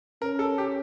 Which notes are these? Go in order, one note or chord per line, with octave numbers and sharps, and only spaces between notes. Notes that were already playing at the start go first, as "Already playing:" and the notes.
C#4 A#4
A4
G4